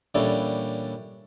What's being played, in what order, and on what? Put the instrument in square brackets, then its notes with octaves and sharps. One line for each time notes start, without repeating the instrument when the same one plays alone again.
[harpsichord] A#2 E3 G3 C#4 D4 A4